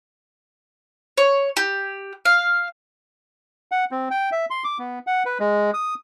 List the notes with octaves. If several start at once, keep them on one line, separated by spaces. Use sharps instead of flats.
C#5
G4
F5
F#5
C4
G5
E5
C6
D6
B3
F#5
B4
G#3
D#6